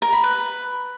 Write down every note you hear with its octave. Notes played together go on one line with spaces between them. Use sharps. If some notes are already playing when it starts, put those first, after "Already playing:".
A#4
B5
B4